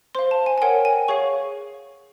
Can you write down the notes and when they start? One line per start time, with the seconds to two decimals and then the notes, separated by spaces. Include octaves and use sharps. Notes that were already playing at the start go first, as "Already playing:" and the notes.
0.15 C5 F5 C6
0.31 A5
0.46 G#5
0.58 G#5
0.62 A#4 C#5 F#5 G5
0.85 G#5
1.08 G#4 C#5 F5 C#6